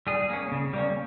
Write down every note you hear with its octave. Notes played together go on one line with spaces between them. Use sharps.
G3 G#4
A#3 C#4
C#3
G3 A#3 C#4